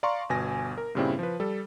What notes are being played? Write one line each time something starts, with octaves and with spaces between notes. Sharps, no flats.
D5 F5 A#5 C6 C#6
G1 B2 G#5 A#6
A#4
G2 A#2 C#3 G3 C4 E4
F3 B4
G3 A4